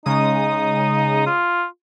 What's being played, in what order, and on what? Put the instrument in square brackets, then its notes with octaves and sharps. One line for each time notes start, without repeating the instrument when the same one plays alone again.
[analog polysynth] C#3 G#3 D#6 [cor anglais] D#4
[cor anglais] F4